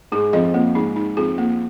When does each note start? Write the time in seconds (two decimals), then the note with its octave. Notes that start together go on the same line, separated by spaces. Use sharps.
0.12 G#2 G#3 G#4
0.33 F2 F3 D#5
0.54 F2 F3 A#3
0.75 G#2 G#3 D#4
0.96 D#4
1.17 F2 F3 G#4
1.38 A#3